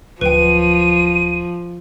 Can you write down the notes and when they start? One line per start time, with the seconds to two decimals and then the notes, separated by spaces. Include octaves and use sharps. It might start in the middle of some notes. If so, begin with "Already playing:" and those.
0.21 D1 F3 B4 G5 D#7